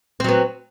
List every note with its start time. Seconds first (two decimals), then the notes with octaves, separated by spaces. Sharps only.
0.20 C4
0.24 F#3
0.29 B3